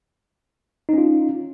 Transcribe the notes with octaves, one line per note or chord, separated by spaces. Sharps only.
C#4 D#4 F4